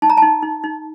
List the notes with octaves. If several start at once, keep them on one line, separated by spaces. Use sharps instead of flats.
D#4 A5
A#5
D#4 A5
D#4
D#4